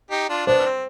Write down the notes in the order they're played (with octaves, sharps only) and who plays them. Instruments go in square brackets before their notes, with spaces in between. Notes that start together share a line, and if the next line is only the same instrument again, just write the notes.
[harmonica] D#4 G4
D4 F4
[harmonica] B3 D4 [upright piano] C5
[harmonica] C4